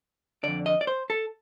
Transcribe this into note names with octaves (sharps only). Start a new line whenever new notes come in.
F2 D3 D5
D#5
D5
C5
A4